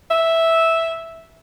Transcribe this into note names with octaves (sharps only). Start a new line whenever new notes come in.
E5